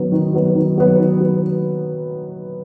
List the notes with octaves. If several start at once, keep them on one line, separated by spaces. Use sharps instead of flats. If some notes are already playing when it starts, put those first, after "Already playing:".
Already playing: D#3 F#3 B3
D#3
F#3 B3
D#3
F#3 B3
D#3
F#3 B3